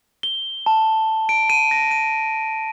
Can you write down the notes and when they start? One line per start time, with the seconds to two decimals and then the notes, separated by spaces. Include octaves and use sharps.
0.23 G7
0.66 A5
1.29 D7
1.50 D#7
1.71 A#6
1.91 D#7